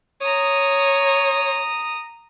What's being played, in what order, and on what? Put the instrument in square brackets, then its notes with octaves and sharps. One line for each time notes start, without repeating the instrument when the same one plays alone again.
[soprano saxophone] C#5 [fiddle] A#5 D#6